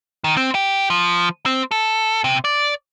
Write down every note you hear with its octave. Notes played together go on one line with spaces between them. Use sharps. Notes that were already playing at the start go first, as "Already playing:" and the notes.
D#3
C4
G4
F3
C4
A4
C3
D5